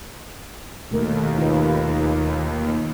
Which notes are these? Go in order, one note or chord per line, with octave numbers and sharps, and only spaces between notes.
D#2 B2 A3 A#4
F4 B4